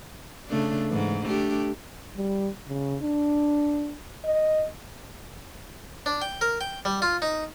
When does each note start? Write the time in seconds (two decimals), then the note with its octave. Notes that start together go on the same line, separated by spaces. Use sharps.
0.48 C#3 A3 D4
0.89 G#2 E3
1.24 A3 D4 G4
2.17 G3
2.67 C#3
3.02 D4
4.24 D#5
6.06 D4
6.22 G5
6.41 A#4
6.61 G5
6.85 G3
7.02 F4
7.22 D#4